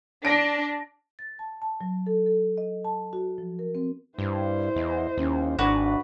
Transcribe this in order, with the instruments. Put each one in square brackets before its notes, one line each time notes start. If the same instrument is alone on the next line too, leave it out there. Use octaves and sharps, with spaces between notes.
[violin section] D4 [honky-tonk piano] A#6 D7
[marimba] A6
A5
A5
F#3
A4
A4
D#5
A5
F#4
F3
A#4
C4
[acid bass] G2 [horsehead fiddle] E4 C5
[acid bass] E2 [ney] D#5
[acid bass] D#2 [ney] C#4
[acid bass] G#1 [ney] D4 [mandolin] F#4 B4 D5